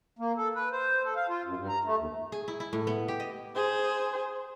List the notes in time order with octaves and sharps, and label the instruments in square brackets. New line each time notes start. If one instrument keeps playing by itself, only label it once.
[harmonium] A#3
A4
B4
C5
A4
F5
F4
F#2
G2
A#5
A3
D#2
[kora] G#4
E4
E4
A2
B3
G4
D#5
[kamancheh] G#4 C5